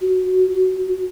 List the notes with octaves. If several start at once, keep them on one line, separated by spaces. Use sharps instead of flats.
F#4